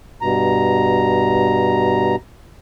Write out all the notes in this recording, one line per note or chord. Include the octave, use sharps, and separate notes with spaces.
G2 B2 A#5